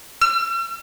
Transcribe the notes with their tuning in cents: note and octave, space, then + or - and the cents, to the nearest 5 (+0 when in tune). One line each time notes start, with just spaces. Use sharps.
E6 +45